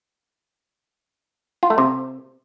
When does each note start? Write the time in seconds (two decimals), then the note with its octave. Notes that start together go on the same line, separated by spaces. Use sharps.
1.63 F4
1.70 A3
1.78 C3